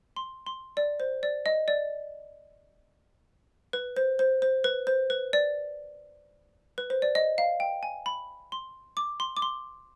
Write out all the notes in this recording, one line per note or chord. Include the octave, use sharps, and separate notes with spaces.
C6
C6
D5
C5
D5
D#5
D5
B4
C5
C5
C5
B4
C5
B4
D5
B4
C5
D5
D#5
F5
G5
G#5
B5
C6
D6
C6
D6
C6